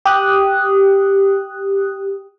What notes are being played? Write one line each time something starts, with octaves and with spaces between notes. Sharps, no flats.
G4 D#6 F#6